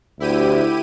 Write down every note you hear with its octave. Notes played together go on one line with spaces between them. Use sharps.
D2 E4 G4 D#7